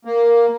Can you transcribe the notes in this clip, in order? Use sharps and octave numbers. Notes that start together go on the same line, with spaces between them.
A#3